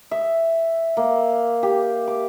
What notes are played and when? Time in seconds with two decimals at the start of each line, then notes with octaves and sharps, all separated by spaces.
0.11 E5
0.97 A#3
1.63 G4
2.08 D6